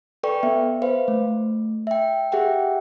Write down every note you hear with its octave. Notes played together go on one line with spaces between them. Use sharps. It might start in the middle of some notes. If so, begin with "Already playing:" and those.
A4 B4 D5 G5 C#6
B3 E5
B4 C5 F5
A3
E5 G5
G4 G#4 E5 F#5 G5